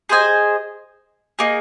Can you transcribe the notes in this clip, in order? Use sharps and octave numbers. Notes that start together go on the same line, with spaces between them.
G#4 C5 D#5 G#5
A#3 D#4 G#4